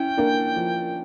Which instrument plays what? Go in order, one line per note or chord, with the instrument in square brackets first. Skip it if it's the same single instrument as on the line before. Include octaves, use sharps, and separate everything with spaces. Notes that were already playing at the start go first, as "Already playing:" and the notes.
Already playing: [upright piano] C#4 E4 [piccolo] G5
[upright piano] A#3 D4
F3